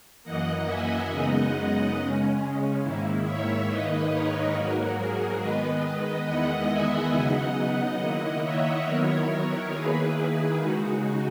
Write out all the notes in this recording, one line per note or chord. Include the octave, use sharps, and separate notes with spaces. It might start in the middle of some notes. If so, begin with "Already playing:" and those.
F#2 E3 A#3 D#5 F#5
E5 G#5
F#2 C#3 G#3 B3 D#4 D#5 F#5
C#3 G#3 C#4
G#2 D#3 A#3 E4
C#5 E5
G#2 D#3 A#3 D#4 B4 D#5
A#4 C#5
G#2 F#3 A#3 F#4 A#4
G#4
D#3 G#3 B3 B4 D#5
E2 D#3 G#3 B3 E4 D#5 F#5
E5 G#5
C#3 F#3 B3 D#4 D#5 F#5
D#5 F#5
D#3 A#3 E4
C#5 E5
D#3 F#3 B3 E4 A#4 C#5
D#3 A#3 E4 G#4 B4
G#4
C#3 G#3 D#4 F#4